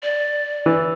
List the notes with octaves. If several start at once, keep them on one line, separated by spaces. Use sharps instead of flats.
D5
E3